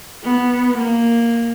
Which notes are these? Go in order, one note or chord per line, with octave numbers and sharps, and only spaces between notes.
B3
A#3